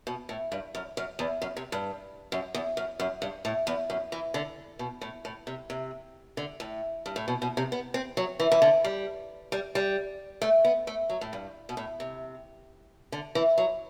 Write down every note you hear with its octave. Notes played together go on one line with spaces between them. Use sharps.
B2
A2
G2
F#2
F#2
E2
F#2
C3
G2
F#2
E2
F#2
F#2
G2
A2
E2
F#2
E3
D3
B2
A2
A2
C3
C3
D3
A2
G2
A2
B2
B2
C3
B3
C4
F#3
E3
E3
D3
G3
G3
G3
A3
B3
A3
F#3
A2
G2
B2
A2
C3
D3
E3
F#3